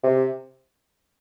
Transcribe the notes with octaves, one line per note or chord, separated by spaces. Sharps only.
C3